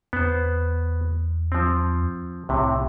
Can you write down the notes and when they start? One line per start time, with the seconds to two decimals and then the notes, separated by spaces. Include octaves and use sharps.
0.13 E2 B3 C5
1.52 F3 C4
2.49 C2 A2 C3